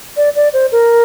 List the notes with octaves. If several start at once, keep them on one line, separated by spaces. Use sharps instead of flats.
D5
D5
C5
A#4